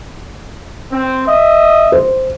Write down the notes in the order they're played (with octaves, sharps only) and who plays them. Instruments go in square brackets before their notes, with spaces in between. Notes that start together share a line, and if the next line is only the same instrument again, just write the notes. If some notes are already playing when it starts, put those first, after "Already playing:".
[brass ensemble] C4
D#5 E5
[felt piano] C5